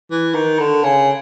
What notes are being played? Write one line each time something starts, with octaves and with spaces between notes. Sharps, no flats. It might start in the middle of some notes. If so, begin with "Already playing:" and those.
E3
D#3
D3
C#3